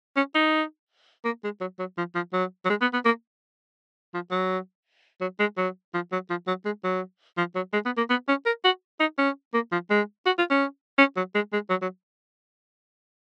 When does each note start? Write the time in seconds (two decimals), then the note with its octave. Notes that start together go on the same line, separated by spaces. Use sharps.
0.17 C#4
0.35 D#4
1.25 A#3
1.44 G#3
1.61 F#3
1.79 F#3
1.98 F3
2.15 F3
2.33 F#3
2.65 F#3
2.70 G#3
2.82 B3
2.93 B3
3.05 A#3
4.14 F3
4.31 F#3
5.21 F#3
5.40 G#3
5.57 F#3
5.94 F3
6.12 F#3
6.30 F3
6.47 F#3
6.66 G#3
6.84 F#3
7.38 F3
7.56 F#3
7.73 G#3
7.86 B3
7.98 A#3
8.10 B3
8.29 C#4
8.46 A#4
8.65 F#4
9.00 D#4
9.18 C#4
9.54 A#3
9.72 F3
9.91 G#3
10.26 F#4
10.38 F4
10.50 C#4
10.98 C#4
11.17 F#3
11.35 G#3
11.53 G#3
11.70 F#3
11.82 F#3